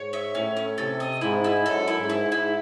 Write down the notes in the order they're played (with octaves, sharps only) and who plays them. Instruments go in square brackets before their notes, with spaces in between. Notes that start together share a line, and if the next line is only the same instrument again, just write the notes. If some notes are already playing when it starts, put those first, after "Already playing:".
Already playing: [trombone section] G#2 [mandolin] C#5
[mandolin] E5
[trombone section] A2 [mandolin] C#4
[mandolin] C#4
[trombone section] C3 [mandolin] A4
[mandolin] D#5
[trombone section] G#2 [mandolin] E4
[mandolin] E4
[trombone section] F#2 [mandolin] A4
[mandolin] E4
[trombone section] G#2
[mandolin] E4
[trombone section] G#2
[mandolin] E4